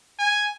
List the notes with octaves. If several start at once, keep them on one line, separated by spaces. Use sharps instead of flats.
G#5